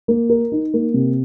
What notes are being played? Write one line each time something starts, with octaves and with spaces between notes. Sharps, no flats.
A#3
A#4
D#4
A#3
C3